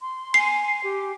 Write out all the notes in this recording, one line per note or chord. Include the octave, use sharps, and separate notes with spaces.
C6
G#5 C7
G4